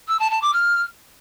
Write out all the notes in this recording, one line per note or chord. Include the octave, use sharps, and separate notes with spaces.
E6
A5
A5
D6
F6